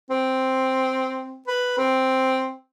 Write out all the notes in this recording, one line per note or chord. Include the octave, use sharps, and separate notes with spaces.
C4
B4
C4